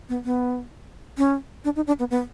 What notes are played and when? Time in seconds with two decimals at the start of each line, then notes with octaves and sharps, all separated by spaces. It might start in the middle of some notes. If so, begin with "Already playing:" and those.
0.09 B3
0.25 B3
1.18 C#4
1.65 D4
1.76 D#4
1.87 D4
1.99 B3
2.11 B3